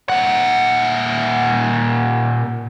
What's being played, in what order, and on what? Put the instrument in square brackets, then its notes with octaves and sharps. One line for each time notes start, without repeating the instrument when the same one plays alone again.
[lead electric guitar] A#2 F#5